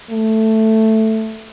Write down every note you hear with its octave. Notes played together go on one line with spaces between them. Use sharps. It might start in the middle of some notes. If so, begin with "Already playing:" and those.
A3